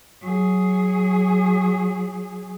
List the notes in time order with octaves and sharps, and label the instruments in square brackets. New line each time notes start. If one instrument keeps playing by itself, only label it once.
[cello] F#3 G#4